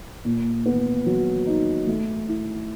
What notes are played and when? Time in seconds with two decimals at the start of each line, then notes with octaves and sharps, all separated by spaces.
0.25 A#2
0.66 B3
1.06 F#3
1.47 D#4
1.87 A3
2.28 E4